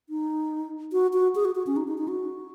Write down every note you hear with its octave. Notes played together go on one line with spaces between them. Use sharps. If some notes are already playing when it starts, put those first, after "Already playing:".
D#4
F#4
F#4
G#4
F#4
F#4
C#4
D#4
D#4
D#4
F#4